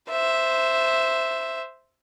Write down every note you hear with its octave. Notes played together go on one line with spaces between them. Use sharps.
C5 E5